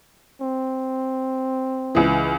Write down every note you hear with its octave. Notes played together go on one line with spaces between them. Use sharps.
C4
C#2 E3